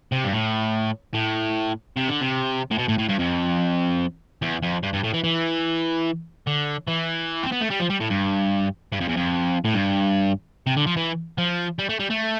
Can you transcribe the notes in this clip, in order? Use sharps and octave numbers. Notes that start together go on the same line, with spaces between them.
C3
G2
A2
A2
C3
D3
C3
A2
B2
A2
A2
G2
F2
E2
F2
G2
G2
A2
E3
E3
D3
E3
C4
B3
A3
G3
F3
G3
A2
G2
G2
F2
E2
F2
A2
G2
C3
D3
F3
E3
F3
G3
A3
G3
A3